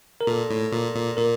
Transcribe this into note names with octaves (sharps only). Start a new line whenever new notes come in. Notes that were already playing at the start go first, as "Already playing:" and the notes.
A#4
A#2 A4
A2
A#2
A#2
A#2 A#4